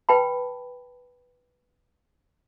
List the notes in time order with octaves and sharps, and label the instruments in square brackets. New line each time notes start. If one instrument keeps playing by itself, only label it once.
[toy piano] B4 G5 A5 B5